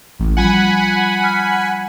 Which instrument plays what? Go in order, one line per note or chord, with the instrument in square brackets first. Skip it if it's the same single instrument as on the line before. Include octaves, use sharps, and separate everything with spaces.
[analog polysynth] A1
[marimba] F3 G3 F4 [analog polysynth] F#5 G#5 B5
[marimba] F6